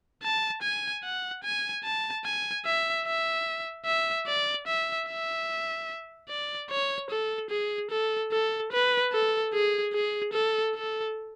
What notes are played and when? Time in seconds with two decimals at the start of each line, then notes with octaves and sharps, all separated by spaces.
0.23 A5
0.62 G#5
1.04 F#5
1.44 G#5
1.84 A5
2.25 G#5
2.66 E5
3.06 E5
3.86 E5
4.27 D5
4.67 E5
5.08 E5
6.29 D5
6.70 C#5
7.11 A4
7.51 G#4
7.91 A4
8.32 A4
8.72 B4
9.13 A4
9.53 G#4
9.94 G#4
10.34 A4
10.75 A4